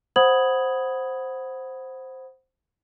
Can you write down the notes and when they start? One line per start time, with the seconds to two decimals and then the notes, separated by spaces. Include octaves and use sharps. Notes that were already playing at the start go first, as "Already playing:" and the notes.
0.16 C5 F#5 B5 D#6 G#6 F#7